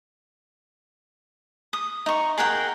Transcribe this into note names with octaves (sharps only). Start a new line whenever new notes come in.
D#6
D#4 C#6
G#4 A#4 F#5 G5